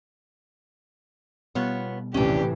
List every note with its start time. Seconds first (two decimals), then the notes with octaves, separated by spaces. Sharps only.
1.55 B2 G3 B3 F4 C#5
2.14 A#1 D#2 A2 C3 E3 C#4 D4 G4